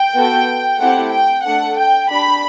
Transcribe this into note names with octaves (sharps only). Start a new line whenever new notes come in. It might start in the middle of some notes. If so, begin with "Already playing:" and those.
Already playing: G5
B3 F#4 A4
A3 C4 E4 G4 F#5
G5
A3 D4 A4 F#5
G5
D4 G4 B5